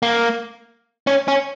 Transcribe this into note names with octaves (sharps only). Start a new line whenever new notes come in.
A#3
C#4
C#4